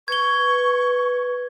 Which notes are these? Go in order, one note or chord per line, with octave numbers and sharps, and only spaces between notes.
B4 C#6 G#6 G7